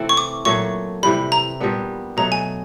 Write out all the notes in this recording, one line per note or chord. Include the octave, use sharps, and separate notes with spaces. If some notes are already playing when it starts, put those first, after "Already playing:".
Already playing: C3 E3 A3 C4 E4
C#6
D6
A#2 F#3 A3 C#6
C3 E3 G3 B5
A#5
A#2 G3 B3 D4
B2 F#3 A3 A#5
G#5